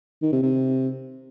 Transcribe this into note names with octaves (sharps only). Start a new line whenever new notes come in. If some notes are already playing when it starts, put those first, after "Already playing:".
D#3
C3
C3